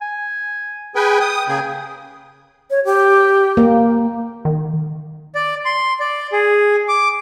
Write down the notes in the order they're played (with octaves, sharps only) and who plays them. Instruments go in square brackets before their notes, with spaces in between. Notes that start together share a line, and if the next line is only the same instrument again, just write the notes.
[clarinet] G#5
[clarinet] G#4 [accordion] B4 G5 G#5
[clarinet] G5 [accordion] D#6
[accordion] C#3 A#3 G#4
[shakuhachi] C#5
G4
[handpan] A#3
[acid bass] D#3
[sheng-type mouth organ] D5
C6
D5
G#4
D6